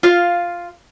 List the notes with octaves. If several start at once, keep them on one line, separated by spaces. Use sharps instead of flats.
F4 F5